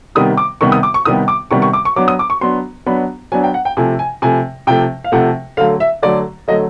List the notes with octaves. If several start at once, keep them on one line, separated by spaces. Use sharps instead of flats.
C3 D#3 G3 B3 D#6
D6
C3 D#3 G3 B3 C#6
D#6
D6
C#6
C3 D#3 G3 B3 D#6
D6
C3 D#3 G3 B3 C#6
C#6
D6
C#6
F#3 B3 D4 D6
D#6
D6
C#6
F#3 B3 D4 C6
F#3 B3 D4 B5
F#3 B3 D4 G#5
G5
F#5
G5
C3 F3 A3 G#5
G#5
C3 F3 A3 G#5
C3 F3 A3 G5
F5
C3 F3 A3 F#5
D3 F#3 A3 F5
E5
D3 F#3 A3 D5
D3 F#3 A3 D#5